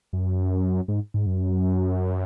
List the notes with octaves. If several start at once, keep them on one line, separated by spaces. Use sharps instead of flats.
F#2
G#2
G#2
F#2